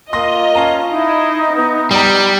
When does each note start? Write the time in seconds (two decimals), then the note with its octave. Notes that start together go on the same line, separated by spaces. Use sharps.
0.13 A#3 F4 D#5 C6 D#6 A#6
0.55 C#4 F5 A5 A#5
0.90 D#4 E4 D#5
1.54 B3
1.91 G3 D5 A#5